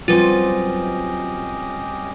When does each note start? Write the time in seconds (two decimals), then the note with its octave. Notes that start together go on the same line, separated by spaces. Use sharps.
0.08 F#3 G3 C4 C#4 F4 G4 B4 D#5